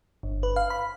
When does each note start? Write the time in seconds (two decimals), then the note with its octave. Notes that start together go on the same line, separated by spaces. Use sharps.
0.23 G1
0.43 B4
0.56 F5
0.70 B5